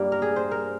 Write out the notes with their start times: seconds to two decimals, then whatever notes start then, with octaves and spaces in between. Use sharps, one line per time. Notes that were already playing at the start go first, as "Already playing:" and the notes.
Already playing: G2 G3 A#3
0.12 A#4
0.22 G#4
0.36 C5
0.51 A#4